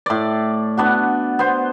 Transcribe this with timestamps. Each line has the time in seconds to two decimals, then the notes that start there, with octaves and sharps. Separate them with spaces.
0.06 A2 D5
0.77 B3 D4 F#4
1.39 B3 C5